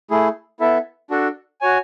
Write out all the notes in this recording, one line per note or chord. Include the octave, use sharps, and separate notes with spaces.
A3 E4 G#4
B3 E4 A4 E5
D4 F#4 A4
F#4 C#5 G#5